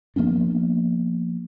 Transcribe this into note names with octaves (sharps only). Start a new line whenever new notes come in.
F3 A#3 B3 D4